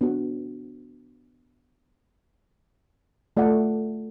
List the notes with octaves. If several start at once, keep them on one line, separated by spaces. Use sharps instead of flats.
B3 D4 F#4
A3 F4 A4 D5 F#5